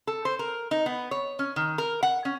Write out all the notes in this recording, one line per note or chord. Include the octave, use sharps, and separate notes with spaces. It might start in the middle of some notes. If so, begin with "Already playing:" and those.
A4
C5
A#4
D#4
B3
C#5
C#4
D#3
A#4
F#5
C#4